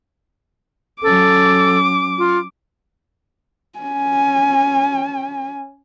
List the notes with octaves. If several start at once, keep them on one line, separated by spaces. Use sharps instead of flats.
F#3 C#4 A4 D6
F4
C#4 G#5